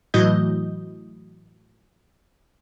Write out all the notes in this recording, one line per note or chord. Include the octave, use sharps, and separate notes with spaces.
A2 E3 F#3 D#5 G6